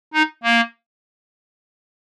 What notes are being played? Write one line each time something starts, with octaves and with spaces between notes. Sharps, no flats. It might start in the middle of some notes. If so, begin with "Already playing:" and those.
D#4
A#3